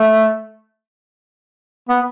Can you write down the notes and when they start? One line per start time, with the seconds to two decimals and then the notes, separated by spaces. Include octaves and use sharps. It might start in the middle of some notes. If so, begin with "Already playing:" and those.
Already playing: A3
1.89 B3